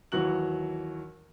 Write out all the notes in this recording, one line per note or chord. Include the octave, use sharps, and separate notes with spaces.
D#2 E3 F#3 F#4 F#6 F#7